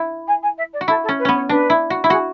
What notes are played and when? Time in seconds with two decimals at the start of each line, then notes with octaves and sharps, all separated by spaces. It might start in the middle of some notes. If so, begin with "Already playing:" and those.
Already playing: E4
0.27 G#5
0.42 G#5
0.58 E5
0.73 D5
0.81 F#4
0.88 E4 A4
1.03 A4
1.09 C#4
1.19 B4
1.25 B3 C#4
1.34 C#5
1.49 D4 B4
1.70 E4
1.90 F#4
2.04 E4
2.10 F#4 G#4